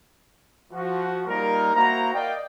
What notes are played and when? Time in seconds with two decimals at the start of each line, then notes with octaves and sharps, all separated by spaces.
0.72 F3 F#4
1.28 G3 A#3 D#4 F4 A#4
1.75 A#3 E4 F#4 C5 A#5
2.14 A#4 D5 D#5 F5 G5